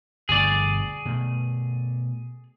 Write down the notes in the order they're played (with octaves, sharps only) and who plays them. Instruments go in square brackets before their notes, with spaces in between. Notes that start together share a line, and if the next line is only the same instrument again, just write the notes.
[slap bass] G1 D2 B2 [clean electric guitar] G#4 D5
[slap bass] B2 A3